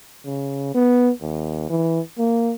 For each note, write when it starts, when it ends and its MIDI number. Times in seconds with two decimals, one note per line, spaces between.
0.26 0.74 49
0.74 1.11 59
1.21 1.70 39
1.70 2.00 52
2.18 2.53 58